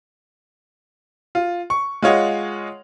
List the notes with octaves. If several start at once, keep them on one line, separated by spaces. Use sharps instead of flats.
F4
C#6
G#3 F4 C#5 D#5 F#5